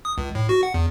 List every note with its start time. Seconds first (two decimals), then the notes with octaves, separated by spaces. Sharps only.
0.05 D#6
0.18 C#2
0.35 A2
0.49 F#4
0.63 F#5
0.74 E2